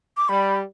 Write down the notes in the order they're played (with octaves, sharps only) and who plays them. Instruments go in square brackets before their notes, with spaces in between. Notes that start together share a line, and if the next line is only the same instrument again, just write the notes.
[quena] D6
[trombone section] G3 [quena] B5